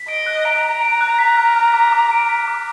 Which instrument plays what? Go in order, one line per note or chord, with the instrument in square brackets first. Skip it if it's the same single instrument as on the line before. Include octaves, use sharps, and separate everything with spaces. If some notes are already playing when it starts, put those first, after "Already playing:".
Already playing: [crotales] B6
[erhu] D#5 [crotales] D7
[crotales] F#6
[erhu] A#5 [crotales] D7
[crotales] D7
D7
F#6
B6
F6
F6
D6
D6
D7
B6
D6